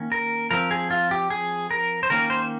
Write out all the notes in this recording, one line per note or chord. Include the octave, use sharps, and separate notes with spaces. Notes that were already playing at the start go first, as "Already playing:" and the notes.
Already playing: D#3 A#3 C#4
A#4
F3 C4 A#4
G#4
F4
G4
G#4
A#4
C5
D#3 A#3 C#4 A#4
C5